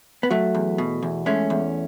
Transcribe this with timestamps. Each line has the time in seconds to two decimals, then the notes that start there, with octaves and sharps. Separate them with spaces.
0.23 B3
0.31 F#3 A3
0.55 E2
0.78 B2
1.03 E2
1.26 G#3 A3 C#4
1.50 E2